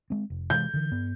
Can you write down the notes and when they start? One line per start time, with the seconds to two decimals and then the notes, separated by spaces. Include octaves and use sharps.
0.10 G#3 C4
0.30 F1
0.50 C3 E3 G#3 G6
0.74 D3 E3
0.91 G2 B3